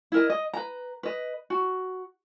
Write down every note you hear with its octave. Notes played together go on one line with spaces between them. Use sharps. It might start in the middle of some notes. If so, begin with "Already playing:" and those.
E4 A#4 D#5
D#5
B4 A#5
B4 D#5
F#4